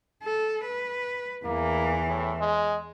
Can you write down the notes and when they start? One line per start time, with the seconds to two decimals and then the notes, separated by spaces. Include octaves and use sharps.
0.23 A4
0.65 B4
1.45 E2 E3 A#3
2.07 A2
2.40 G#3